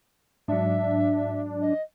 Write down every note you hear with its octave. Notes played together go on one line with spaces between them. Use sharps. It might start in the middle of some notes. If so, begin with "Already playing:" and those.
G#2 F#3 D4 E5
D#5